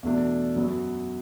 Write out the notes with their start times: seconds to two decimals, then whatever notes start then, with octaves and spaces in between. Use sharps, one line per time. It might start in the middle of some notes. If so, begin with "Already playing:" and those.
0.03 E2 B2 A3 D4
0.56 F#2 F#3 B3 F#4